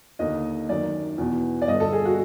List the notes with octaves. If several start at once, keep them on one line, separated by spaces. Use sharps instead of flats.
D#2 D3 D#5
F#2 D#3 D5
E2 B2
D5
G2 D3 D#5
A4
G#4
F#4